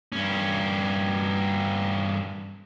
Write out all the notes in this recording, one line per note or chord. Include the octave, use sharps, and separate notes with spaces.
G2 C#4